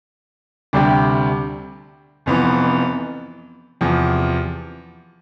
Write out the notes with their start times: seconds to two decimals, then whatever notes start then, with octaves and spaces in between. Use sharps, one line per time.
0.73 D2 C3 G3 D4 G4
2.26 F1 F2 E3 B3
3.81 E2 C3 F3